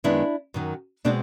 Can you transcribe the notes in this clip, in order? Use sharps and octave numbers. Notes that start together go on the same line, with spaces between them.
F#2 D#3 G#3 B3 D4 E4
F#2 D#3 F#3
B2 G#3 C4 D4